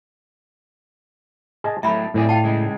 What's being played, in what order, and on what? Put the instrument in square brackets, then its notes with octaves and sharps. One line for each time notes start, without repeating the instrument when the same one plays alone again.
[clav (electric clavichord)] G#4 D#5 A5
[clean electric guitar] A2 F#3 A3 [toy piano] E5 B5 [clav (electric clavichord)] A#5
[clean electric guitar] B1 C4 G#4 [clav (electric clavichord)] A2 D5
[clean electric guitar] F4 [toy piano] G5 A5
[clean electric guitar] C#3 G#3